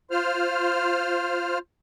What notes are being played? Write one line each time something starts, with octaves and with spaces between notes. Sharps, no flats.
F4 C5 F6